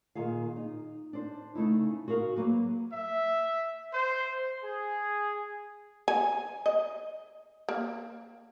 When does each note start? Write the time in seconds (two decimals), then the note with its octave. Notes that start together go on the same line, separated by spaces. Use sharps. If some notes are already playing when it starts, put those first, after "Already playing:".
0.15 A#2 D#3 G#4 F5
0.56 D#4
1.13 D4 C5
1.55 C#3 A3 D#4 E4
2.08 F#4 G#4 A#4 F5
2.36 F#3 A#3 B4
2.93 E5
3.94 C5
4.64 G#4
6.08 G#5
6.66 D#5
7.69 A#3